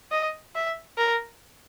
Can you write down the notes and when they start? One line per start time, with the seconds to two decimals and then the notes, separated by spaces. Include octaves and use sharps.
0.11 D#5
0.55 E5
0.97 A#4